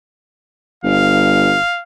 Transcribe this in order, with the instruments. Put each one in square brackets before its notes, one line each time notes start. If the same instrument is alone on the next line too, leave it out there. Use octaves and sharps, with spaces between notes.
[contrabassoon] G1 [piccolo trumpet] F5